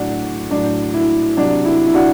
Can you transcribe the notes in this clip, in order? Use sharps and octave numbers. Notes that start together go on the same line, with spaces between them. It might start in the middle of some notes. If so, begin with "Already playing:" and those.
Already playing: A2 F#3 D4 F#4
A2 F#3 D4
E4
C3 F#3 D4
E4
E4
D4 F#4